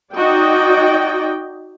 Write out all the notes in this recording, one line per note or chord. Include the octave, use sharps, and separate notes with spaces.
D#4 F#4 D5 D#5 G5